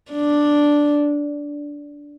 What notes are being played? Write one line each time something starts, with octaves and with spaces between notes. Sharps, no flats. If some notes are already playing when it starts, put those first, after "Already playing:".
D4